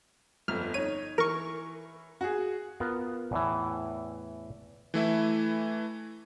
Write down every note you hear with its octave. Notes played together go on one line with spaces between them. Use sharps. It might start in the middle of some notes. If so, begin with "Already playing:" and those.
G1 F2 F6
D#4 C#5 D#7
E3 A#4 C#6
F#4 G#4
B3 F4 A#4 F#5
E2 A2 E3
E3 A3 E4 E5